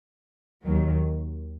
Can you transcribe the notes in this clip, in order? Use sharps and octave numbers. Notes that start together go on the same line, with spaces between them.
D#2 D#3 F#3